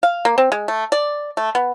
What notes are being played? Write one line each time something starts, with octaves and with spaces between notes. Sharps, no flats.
F5
A#3
C4
G#3
A3
D5
A3
B3